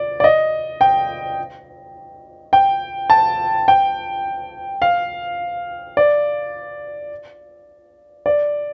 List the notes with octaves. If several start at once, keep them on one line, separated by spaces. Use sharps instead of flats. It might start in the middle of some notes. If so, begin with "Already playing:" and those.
Already playing: D5
D5
D#5
G5
G5
A5
G5
F5
D5
D5